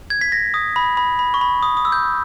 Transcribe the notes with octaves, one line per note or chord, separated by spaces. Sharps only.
G#6
B6
A#6
D#6
B5
B5
B5
C#6
B5
D#6
D#6
E6
G6